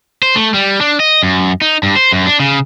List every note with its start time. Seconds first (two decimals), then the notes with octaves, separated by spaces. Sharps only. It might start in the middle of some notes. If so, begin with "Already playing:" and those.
0.22 C5
0.36 A3
0.54 G3
0.81 D4
1.00 D#5
1.23 F#2
1.61 D#4
1.83 G2
1.96 C5
2.12 F#2
2.26 D4
2.40 C#3